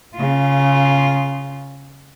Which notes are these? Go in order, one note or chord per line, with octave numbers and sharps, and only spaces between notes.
C#3 F4